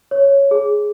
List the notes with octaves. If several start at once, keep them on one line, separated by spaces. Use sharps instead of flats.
C#5
G#4